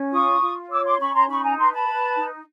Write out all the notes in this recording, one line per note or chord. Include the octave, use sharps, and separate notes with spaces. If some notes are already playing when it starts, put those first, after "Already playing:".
Already playing: C#4
F4 C#6 D#6
F4
C#5 D6 E6
C6 D6
C#4 B5 C#6
A#5 C6
D#4 B5 C#6
G#5 A#5
B4 A#5 C6
A5 B5
B4
D#4